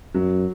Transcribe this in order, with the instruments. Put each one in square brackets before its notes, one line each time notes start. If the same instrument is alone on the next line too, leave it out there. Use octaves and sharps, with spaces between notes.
[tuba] F#2 [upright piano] F#3